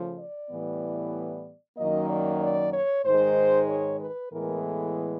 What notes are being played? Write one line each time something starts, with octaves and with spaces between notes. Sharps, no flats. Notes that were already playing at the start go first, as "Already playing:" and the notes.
Already playing: C#3 F3 A3
D5
A2 E3 G3 B3
F#2 D#3 F#3 A#3 D#5
D5
D5
C#5
G#2 D#3 G#3 C5
C#5
B4
A2 E3 G#3 B3 A#4
A4